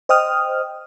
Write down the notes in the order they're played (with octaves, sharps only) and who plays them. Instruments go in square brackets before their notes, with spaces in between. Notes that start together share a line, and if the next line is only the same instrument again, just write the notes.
[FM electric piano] C5 D#5 G5 D#6 F6